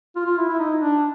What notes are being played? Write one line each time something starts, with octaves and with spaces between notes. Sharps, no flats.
F4
F4
E4
E4
D#4
D4